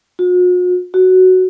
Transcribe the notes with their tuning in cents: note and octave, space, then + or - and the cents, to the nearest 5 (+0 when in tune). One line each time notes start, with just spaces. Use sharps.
F#4 -45
F#4 +5